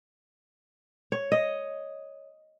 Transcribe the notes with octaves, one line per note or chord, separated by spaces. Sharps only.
C#5
D#5